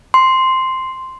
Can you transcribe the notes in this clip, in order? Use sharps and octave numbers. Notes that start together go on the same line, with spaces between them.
C6